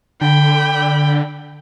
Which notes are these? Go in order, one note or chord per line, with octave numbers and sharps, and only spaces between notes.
D3 G5 B5